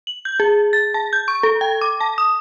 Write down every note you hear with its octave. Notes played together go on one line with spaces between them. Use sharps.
F#7
G6
G#4
A6
A5
G6
C#6
A4
G5
D6
A5
D#6